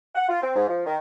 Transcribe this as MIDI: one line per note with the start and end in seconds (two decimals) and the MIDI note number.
0.15 0.26 78
0.28 0.41 65
0.42 0.53 60
0.54 0.67 44
0.67 0.82 53
0.86 0.96 51